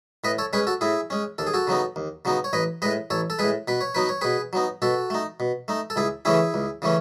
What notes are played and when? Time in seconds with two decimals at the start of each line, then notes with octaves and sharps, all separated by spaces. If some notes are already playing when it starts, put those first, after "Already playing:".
0.24 A2 B4 D#5
0.38 A4 C#5
0.53 G#3 C#4 G#4 B4
0.67 F#4 A4
0.81 A2 E4 G#4
1.10 G#3 C#4
1.38 D#2 A4
1.47 G#4
1.54 F#4 A4
1.67 C#3 F#3 B3 D#4
1.96 D#2
2.25 C#3 F#3 B3 D#4
2.44 C#5
2.53 A1 B4 D#5
2.82 A2 G#3 B4 D#5
3.10 A1 A4 C#5
3.30 A4
3.39 G#3 G#4 B4
3.43 A2
3.68 B2 B4
3.81 C#5
3.95 F#3 B3 D#4 B4
4.09 C#5
4.21 B2 G#4 B4
4.53 F#3 B3 D#4
4.82 B2 F#4 A4
5.10 A3 D#4
5.40 B2
5.68 A3 D#4
5.90 A4
5.96 C#2 E4 G#4
6.25 C#3 E3 A3 C#4 E4 G#4
6.54 C#2
6.82 C#3 E3 A3 C#4